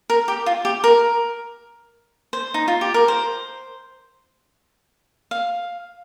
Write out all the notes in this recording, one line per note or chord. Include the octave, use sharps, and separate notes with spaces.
A#4
G4
F4
G4
A#4
C5
D#4
F4
G4
A#4
C5
F5